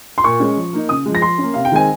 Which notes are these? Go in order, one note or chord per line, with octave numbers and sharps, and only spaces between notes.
C6
A#2 C#6
G#3 C#4
F3
A#3 D#4
C#3 D#6
F3 G#3
A#6
F3 C6
A#3 C#4
C3 F5
G5
D#3 G#3 C4 G#5